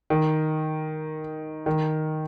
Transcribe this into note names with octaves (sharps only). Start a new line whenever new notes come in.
D#3
D#3